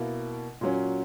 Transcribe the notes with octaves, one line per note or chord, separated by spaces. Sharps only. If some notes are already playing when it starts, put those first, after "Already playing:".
Already playing: B2 A#3 E4
A#2 F#3 C#4